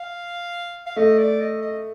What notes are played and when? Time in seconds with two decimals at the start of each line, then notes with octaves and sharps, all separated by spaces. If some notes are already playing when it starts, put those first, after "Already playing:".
Already playing: F5
0.86 F5
0.96 A3 D#5
1.18 D5
1.40 D#5
1.62 D#5